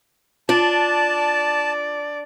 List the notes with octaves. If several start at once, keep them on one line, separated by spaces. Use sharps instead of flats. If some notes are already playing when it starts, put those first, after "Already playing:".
D4 F4 D5 A5